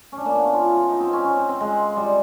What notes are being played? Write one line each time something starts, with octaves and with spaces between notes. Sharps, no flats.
C#4
D4
A#3
B3
C#4
F4
E4
F4
D#4
C4
C#4
C#4
C4
C4
G#3
G3